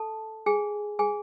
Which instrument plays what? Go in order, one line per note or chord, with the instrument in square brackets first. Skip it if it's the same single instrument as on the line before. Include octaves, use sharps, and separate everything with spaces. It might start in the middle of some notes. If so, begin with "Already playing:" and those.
Already playing: [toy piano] A4 A5
G#4 G#5
G#4 G#5